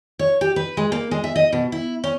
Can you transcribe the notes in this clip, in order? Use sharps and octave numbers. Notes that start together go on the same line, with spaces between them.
C#5
G4
B4
G#3
A#3
G#3
E5
D#5
B2
E4
C#4